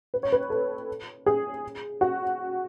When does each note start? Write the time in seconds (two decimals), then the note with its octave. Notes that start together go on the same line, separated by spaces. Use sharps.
0.14 B4
0.23 C#5
0.32 B4
0.50 A4
1.26 G#4
2.01 F#4